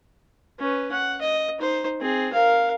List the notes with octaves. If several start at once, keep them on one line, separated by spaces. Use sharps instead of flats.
C#4 B4
F#5
D#5
D#4 C5
C4 G#4
A#4 F5